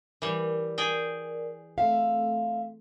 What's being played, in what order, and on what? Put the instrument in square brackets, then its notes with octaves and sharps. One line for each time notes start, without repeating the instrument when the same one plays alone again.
[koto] E3 G3 [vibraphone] A#4 D5
[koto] G#4 G5
[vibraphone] A3 C4 A4 [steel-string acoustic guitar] E5 F5